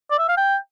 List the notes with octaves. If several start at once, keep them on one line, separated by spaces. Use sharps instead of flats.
D5
E5
F5
G5